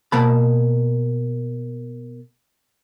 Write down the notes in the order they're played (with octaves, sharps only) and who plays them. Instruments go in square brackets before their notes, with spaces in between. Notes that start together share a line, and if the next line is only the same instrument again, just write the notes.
[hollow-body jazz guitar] B2 A#3 A5 B5